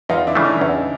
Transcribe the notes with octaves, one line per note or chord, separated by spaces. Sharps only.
E2 D#4 F4
D4 E4
C#3 E3 A3
C#4 D#4
E2